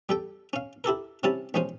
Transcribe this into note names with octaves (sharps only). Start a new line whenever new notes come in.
G3 A4 G5
C#4 F5
E4 G4 A4 A#4
C3 G3 C#4 E4 A5
B1 F3 G#3 C#4 C5